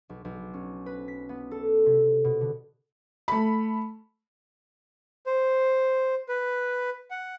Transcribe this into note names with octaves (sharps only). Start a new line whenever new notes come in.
B1
B1
C#4
B4
B6
B3
A4
C3
B2
D3
A3 B5
C5
B4
F#5